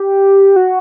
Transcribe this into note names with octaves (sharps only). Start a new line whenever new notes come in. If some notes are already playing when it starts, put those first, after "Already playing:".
Already playing: G4
F#4